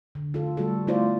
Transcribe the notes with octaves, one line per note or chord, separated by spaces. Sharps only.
D3
F4 A4
G3 A3 F#4 A4
A3 B3 E4 F4 C5 D5